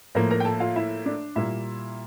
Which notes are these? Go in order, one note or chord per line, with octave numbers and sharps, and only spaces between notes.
A2 F3 A#3 A#4 A#5
A#4 A#5
G5
A4 A5
F4 F5
E4 E5
D4 D5
A#2 G3 A#3 E4 E5